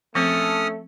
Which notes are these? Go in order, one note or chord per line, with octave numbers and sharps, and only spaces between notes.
F3 A3 C4 C#4 A4 D#6 F6